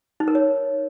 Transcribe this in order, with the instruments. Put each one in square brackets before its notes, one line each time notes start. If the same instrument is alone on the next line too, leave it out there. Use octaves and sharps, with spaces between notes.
[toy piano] D#4
A#4
C#5